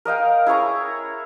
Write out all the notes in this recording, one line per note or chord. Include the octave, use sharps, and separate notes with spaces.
A#4 D#5 F5 G5
E4 G#4 C#5 A#5